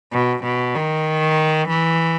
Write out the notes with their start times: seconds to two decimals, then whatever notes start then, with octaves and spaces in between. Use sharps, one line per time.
0.13 B2
0.43 B2
0.75 D#3
1.68 E3